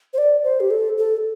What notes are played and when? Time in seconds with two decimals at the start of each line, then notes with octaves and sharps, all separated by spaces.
0.14 C5
0.18 D5
0.44 C5
0.60 G4
0.71 A4
0.98 A4